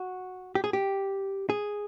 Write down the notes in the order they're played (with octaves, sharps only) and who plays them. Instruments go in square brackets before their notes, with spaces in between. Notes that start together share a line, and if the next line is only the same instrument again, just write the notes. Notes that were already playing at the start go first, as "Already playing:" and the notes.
Already playing: [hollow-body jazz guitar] F#4
G4
G#4
G4
G#4